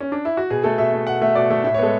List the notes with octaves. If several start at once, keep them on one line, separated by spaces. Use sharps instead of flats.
C#4
D4
E4
F#4
B2 G#4
A3 A4
B2 E5
A3
B2 F#5
A3 E5
B2 D5
A3 E5
A2 E5
C#5
G#3 B3 A4